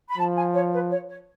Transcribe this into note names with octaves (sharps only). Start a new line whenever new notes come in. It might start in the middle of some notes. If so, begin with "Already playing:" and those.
B5
F3 A5
G#5
C#5
B4
C#5
C#5